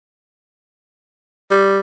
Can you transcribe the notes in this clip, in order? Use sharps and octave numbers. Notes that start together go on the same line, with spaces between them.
G3